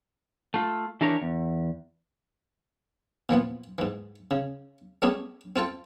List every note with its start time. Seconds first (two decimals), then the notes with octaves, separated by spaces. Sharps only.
0.54 A3 F4
1.01 E3 D4 G4 A#4 C#5
1.22 E2
3.29 A#2 E3 F3 B3
3.78 G#2 E3
4.31 C#3
5.02 G3 A3 B3 C#4 G4 G#4
5.56 C4 F4 A4 G5